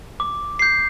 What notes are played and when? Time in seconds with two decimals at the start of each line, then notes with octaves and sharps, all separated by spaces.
0.20 D6
0.59 G6 C7